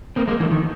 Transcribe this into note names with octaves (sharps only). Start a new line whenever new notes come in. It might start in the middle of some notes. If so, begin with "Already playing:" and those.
A#3 C4
G#3 A#3
D3 E3
D#3